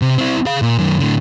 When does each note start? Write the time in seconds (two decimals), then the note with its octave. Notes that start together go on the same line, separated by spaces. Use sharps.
0.02 C3
0.18 C4 E4
0.46 G#4 F5
0.62 A#2
0.78 F#2 D#3
1.00 A2 D3